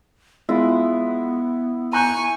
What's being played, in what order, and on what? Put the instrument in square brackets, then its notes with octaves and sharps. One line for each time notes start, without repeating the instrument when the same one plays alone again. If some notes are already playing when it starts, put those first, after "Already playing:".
[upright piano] G#3 F4 [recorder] B3 [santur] E4
[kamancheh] G#5 C#6 [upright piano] A#5 F#6 G6